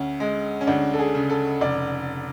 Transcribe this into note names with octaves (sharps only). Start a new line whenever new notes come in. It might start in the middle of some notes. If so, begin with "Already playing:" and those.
Already playing: D2 C#4
G#3
C#4
D2 D4
A4
G#4
C#3
A4
F1 D5